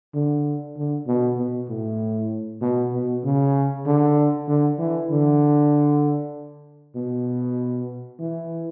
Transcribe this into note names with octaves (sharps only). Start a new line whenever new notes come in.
D3
D3
B2
B2
A2
B2
B2
C#3
D3
D3
E3
D3
B2
E3